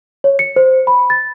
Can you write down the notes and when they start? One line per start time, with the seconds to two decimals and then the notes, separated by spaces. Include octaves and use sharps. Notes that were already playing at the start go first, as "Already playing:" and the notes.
0.24 C#5
0.39 C#7
0.56 C5
0.87 B5
1.10 A6